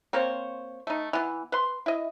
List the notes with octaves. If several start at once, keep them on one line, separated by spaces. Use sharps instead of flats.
A#3 C4 C5 C#5
A3 D#4
E3 B3
B4 C6
E4 D#5